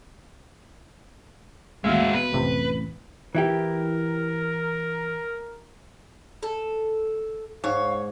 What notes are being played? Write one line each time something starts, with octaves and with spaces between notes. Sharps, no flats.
A1 D#2 G#3 F#4 E5 F5
B2 B4
A1 F2 C3
E3 E4 G4 A#4
A4
G#2 C#5 F5